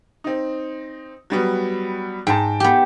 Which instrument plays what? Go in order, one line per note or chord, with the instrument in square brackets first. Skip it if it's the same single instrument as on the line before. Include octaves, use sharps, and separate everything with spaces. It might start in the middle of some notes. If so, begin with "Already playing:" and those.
[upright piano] C4 D#4
F#3 G3 B3
[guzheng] G#2 A#5 [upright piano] G5 A5
[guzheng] B3 G4